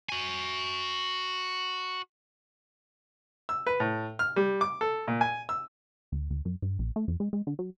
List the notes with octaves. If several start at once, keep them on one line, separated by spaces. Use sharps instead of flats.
F#4 G#5
E6
B4
A2
F6
G3
D6
A4
A#2
G#5
E6
D2
D2
F#2
G2
A#1
A3
F2
G#3
G#3
D3
F#3